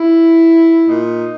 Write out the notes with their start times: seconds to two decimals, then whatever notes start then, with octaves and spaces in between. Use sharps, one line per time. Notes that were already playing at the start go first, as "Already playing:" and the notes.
Already playing: E4
0.89 A#2 D#4